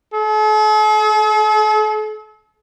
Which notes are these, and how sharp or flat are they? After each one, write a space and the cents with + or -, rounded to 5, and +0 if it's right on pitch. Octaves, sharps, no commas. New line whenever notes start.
A4 -45